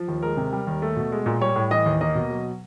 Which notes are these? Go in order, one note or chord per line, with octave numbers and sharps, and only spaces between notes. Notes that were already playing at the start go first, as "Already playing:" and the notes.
Already playing: F3
D#2
G#3 A#4
C3
G3
D#2
A3
B2
G#3
A#2
G3 C#5
A2
E3 D#5
D#2
A#3 D#5
B2
F#3